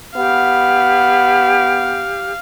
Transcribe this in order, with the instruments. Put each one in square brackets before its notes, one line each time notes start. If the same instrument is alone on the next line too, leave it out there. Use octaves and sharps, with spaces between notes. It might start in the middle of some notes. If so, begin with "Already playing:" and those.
[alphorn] B3 [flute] G4 [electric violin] F5